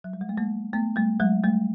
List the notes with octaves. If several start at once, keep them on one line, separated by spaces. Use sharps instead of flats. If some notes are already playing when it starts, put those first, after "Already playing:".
F#3
G3
G#3
A3
G#3 A#3
A3 B3
G3 A3
F#3 G#3
G3 A3